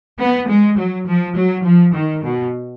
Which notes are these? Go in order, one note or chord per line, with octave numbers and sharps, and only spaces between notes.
B3
G#3
F#3
F3
F#3
F3
D#3
B2